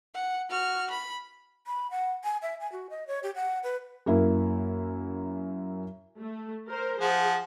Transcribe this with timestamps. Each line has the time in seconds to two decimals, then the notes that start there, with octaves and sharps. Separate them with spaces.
0.14 F#5
0.49 F#4 F6
0.90 B5
1.67 B5
1.91 F#5
2.24 G#5
2.42 E5
2.60 G#5
2.72 F#4
2.90 D#5
3.07 C#5
3.23 G4
3.35 F#5
3.64 B4
4.06 F#2 A#3 E4
6.18 A3
6.68 A#4 C5
7.01 F3 G#4 F#5